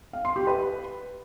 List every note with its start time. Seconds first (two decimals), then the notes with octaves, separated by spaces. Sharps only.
0.13 F5
0.25 C6
0.36 G4
0.47 B4